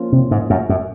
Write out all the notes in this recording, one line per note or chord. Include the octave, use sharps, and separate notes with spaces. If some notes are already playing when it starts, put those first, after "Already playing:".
Already playing: F3 A#3 C#4 F4
C3
G#2
F#2
F#2